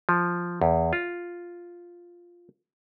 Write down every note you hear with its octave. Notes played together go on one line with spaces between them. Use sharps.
F3
E2
F4